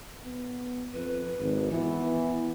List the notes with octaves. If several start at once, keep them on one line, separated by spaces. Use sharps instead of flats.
B3
F2 B4
G#1
E3 B3